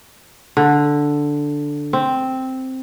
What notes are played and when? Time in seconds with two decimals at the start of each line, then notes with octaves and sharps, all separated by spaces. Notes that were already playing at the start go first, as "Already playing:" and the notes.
0.57 D3
1.93 C4